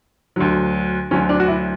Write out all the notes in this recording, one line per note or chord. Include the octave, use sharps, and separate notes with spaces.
D2 D3 F#3
D2 D3 F#3 C#4
D4
F#4
E4